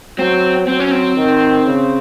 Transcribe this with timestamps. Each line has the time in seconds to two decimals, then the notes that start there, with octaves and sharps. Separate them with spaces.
0.18 F#3 C4
0.67 F#3 C4
0.79 C#4
0.91 C4
1.16 D#3
1.65 C#3